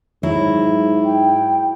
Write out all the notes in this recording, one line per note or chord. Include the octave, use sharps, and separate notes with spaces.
G#2 F#3 E4
G5